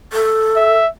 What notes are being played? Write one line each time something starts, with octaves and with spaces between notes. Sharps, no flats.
A4
E5